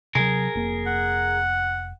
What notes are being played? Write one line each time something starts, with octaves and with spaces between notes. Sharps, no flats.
C3 F#3 G#4 A#4
F1 A#3
F#5